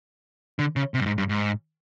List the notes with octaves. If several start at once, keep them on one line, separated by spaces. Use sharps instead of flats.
D3
C#3
C3
G2
G#2
G2
G#2